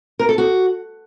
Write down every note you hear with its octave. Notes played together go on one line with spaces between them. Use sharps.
A#4
A4
F#4